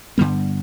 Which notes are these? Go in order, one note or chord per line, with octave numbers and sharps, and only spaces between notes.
G2 D3 G3 B3